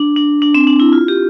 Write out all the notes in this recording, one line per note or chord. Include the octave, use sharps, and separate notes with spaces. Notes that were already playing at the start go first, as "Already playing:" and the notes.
Already playing: D4
D4
D4
C4
D4
E4
F4
G4